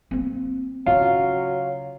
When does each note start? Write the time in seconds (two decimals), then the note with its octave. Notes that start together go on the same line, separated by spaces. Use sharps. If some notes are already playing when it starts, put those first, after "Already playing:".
0.11 A#3 C4
0.86 C#3 F#3 F4